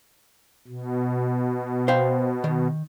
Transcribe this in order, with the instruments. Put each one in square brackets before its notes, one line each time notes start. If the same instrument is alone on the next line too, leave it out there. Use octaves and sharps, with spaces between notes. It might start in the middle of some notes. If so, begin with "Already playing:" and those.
[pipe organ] B2
[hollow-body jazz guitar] C5 F5 G5
D#3